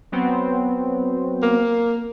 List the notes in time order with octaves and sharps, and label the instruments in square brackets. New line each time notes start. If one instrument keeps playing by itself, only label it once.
[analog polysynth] F#3 B3 C4
[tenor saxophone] A#3